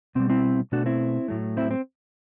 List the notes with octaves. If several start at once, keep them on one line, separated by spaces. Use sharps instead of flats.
B2 G3 C4
C4 E4
B2 A3 D4 F#4
C4 E4
A2 F#3 A3
C4 E4
C4